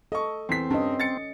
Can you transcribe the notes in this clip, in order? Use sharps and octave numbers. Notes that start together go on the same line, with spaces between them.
A4 D#5 C#6
E2 C4 B6
G2 C#4 D#5
A6 C#7